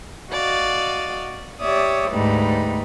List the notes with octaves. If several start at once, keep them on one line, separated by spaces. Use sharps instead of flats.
F#4 D5 D#5 F5
G4 C#5 D5 E5 D#6
D2 G#2 G3 A3 D#4 B4